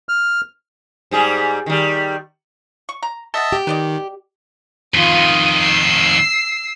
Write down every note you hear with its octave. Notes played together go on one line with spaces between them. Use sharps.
F6
G#2 G3 G#4
D#3 G3
C#6
A#5
A4 D#5 E5 F#5 A5
G4
D#3 B4 D5 D#5
F2 D#3 F4 D#7
E6 C7